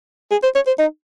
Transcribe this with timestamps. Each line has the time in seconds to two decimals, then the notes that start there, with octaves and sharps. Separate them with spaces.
0.31 G#4
0.43 C5
0.55 C#5
0.67 C5
0.79 D#4